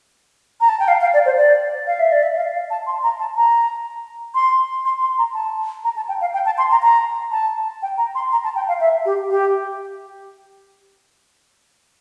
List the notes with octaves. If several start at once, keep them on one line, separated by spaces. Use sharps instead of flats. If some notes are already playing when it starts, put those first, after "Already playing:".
A#5
A5
G5
F5
F5
D5
C5
D5
F5
E5
D5
E5
F5
F5
A5
C6
A#5
A5
A#5
C6
C6
C6
A#5
A5
A#5
A5
G5
F5
G5
A5
C6
A#5
A#5
A5
G5
A#5
C6
A#5
A5
G5
F5
E5
G4
G4